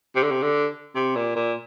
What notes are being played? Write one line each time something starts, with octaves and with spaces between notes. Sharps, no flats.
C3
D3
C3
D3
C3
A#2
A#2